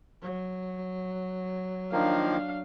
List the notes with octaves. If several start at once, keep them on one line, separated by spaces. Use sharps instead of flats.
F#3
D#3 F3 A#3 D4 F5